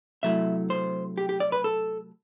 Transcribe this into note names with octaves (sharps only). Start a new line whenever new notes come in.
C3 F#3 A3 E4 E5
C5
G4
G4
D5
B4
A4